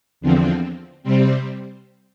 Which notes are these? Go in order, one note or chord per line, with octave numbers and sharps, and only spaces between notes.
E2 D3 F3 C4
C3 G3 C4